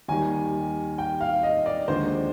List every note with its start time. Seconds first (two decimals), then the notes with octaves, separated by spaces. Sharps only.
0.08 D#2 D#3 G3 G#5
0.98 G5
1.21 F5
1.43 D#5
1.66 D5
1.88 D#2 D3 F3 G#3 C5